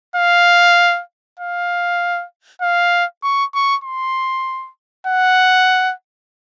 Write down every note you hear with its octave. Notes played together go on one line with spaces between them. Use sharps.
F5
F5
F5
C#6
C#6
C6
F#5